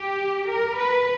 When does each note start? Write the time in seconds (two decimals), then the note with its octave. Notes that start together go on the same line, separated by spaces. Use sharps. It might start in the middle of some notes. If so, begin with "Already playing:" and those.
Already playing: G4
0.48 A#4
0.77 B4